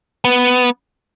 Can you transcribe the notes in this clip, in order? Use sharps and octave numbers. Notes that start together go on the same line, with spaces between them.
B3